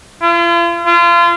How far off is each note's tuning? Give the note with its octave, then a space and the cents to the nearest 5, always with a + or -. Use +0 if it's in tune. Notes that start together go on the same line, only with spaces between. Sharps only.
F4 -40
F4 -30